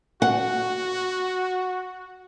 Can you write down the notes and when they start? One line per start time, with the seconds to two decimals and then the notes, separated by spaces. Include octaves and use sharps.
0.22 F#4 F#5